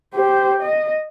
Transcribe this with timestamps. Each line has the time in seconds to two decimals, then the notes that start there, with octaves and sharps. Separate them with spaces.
0.14 G4 C5
0.63 D#5